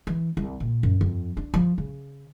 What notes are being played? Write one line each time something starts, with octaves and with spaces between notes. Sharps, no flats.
E3
C2
A#2
F#2
F2
D4
F3
C#3